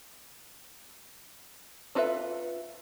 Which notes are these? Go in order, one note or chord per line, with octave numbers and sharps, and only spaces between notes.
D4 F4 A4 B4 E5